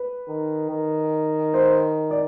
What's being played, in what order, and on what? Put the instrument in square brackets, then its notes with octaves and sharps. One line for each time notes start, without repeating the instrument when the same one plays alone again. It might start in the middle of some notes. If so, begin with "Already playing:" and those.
Already playing: [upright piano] B4
[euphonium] D#3
D#3
[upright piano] C5
D5